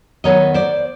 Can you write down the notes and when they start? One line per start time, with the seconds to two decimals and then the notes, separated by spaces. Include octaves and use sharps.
0.24 D#3 F#3 B3 C#5 D#5
0.54 C5 D5